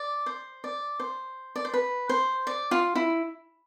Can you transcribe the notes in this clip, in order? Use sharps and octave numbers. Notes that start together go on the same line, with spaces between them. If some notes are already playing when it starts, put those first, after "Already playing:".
Already playing: D5
C5
D5
C5
D5
C5
B4
C5
D5
F4
E4